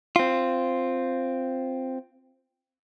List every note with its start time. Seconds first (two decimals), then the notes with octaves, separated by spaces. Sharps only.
0.16 C4 F4